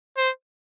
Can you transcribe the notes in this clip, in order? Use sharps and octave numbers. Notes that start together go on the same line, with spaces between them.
C5